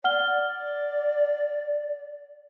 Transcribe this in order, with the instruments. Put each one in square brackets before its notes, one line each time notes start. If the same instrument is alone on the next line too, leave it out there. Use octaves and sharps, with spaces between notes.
[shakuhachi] D5 [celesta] F#5 F6 G7